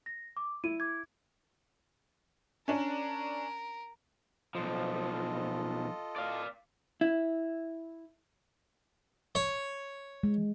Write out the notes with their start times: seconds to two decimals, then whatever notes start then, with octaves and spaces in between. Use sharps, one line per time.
0.06 A#6
0.37 D6
0.64 E4 D#7
0.80 D6 G#6
2.68 C#4 D4 A#4
4.55 B1 F3 F4 A4 D#5
6.16 D5 F5
7.01 E4
9.35 C#5
10.23 G#3